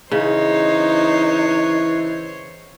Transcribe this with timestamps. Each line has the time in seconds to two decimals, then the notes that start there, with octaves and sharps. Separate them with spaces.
0.11 C#3 E3 D#4 C5 C#5